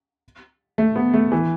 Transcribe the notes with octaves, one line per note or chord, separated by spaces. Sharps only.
A3
B3
A3
E3